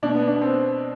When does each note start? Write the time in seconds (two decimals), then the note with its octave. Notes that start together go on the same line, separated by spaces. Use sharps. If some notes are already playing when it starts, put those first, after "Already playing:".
0.03 B2 D4
0.15 B3
0.28 D4
0.42 C4